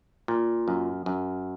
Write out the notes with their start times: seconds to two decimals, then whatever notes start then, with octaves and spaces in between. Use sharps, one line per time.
0.28 A#2
0.68 F#2
1.06 F#2